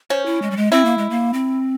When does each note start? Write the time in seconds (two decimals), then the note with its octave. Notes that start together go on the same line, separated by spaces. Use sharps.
0.10 C#4 C5
0.26 E4
0.42 G#3
0.51 G3
0.57 G#3
0.72 C4 E4
0.85 A#3
0.98 G#3
1.10 A#3
1.33 C4